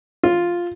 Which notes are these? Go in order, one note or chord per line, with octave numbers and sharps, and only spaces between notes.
F4